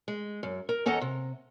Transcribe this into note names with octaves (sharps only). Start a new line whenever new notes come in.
G#3
F#2
A#4
E2 C#4 A4 D#5 F#5 A#5
C3